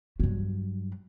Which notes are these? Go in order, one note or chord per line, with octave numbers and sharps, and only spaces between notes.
G2 F#3